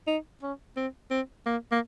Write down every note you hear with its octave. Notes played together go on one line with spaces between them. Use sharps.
D#4
C#4
C4
C4
A#3
A#3